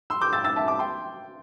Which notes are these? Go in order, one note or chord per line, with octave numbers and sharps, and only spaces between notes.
C6 E6
D6 G6
E6 A6
E6 A6
E5 A5
A5 D6
G5 C6